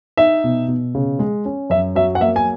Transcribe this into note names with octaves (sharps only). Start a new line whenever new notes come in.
D#4 E5
B2
B2
C#3
G#3
C#4
F#2 E5
F#3 E5
F#5
A#3 E5
G#5